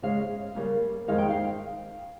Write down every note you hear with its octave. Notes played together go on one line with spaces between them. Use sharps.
C#3 G#3 C#4 F5
C#3 G3 A#3
F2 D#3 G#3 D#4 F5
G5
F5